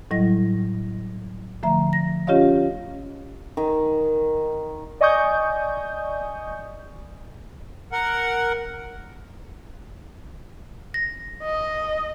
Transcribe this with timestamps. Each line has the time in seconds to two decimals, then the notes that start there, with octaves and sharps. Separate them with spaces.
0.11 A2 F#3 G3 E4 D#5 A#6
1.63 D3 F3 A3 E5 A#5
1.93 A#6
2.27 C#4 F4 G4 C#5 D#5 F5
3.57 D#3
5.01 D5 D#5 G#5 C#6 D#6 G6
7.92 A#4 F#5
10.94 A#6
11.43 D#5